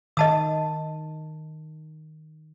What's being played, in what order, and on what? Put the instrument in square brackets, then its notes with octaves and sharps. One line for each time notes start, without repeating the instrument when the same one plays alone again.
[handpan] D#3 [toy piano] D#5 A5 D#6